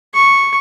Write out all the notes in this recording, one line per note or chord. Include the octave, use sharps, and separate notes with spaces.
C#6